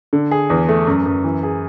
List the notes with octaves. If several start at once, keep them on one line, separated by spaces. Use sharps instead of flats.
D3
G#4
E2
A3
F#2
F#2
E3
G#4